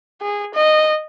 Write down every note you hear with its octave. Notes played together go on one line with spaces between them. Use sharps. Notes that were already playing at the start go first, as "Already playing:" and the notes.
G#4
D#5